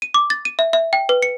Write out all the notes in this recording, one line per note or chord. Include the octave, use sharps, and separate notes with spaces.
D#7
D6
A6
D#7
E5
E5
G5
B4
C#7